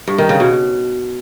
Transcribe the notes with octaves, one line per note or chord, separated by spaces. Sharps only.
G2
D#3
C#3
B2